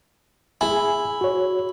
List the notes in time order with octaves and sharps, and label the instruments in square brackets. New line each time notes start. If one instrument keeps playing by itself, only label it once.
[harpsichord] E4 [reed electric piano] G#4 G#5
[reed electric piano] F#4 C#5